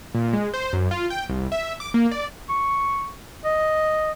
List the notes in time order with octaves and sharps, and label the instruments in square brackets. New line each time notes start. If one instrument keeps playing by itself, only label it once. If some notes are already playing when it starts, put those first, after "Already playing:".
[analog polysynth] A#2
G#3
C5
F#2
F4
G5
C2
E5
D6
A#3
D5
[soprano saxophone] C#6
D#5